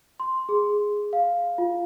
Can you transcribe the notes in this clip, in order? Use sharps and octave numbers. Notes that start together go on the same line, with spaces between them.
C6
G#4
F5
F4